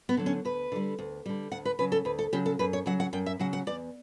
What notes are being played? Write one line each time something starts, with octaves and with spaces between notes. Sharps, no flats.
B3
D3 F#3
C#4
D2 B4
D3 G3
D2
D3 G3
D2 F#5
B4
C#3 F#3 B4
A4
D2 B4
A4
C#3 F#3 G4
A4
F#2 B4
C#5
C#3 F#3 F#5
F#5
F#2 G5
E5
C#3 F#3 F#5
F#5
E2 D5